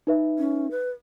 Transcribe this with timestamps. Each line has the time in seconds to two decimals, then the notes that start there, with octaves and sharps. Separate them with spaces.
0.07 D#4 B4 E5
0.39 C#4
0.71 B4